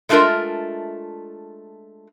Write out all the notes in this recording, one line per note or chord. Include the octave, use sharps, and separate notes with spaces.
G#3 A3 D4 F4 A#4 E5